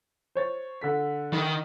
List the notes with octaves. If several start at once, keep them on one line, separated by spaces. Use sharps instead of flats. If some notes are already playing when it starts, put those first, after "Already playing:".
C5 C#5 A6
D3 A4 B6
D#3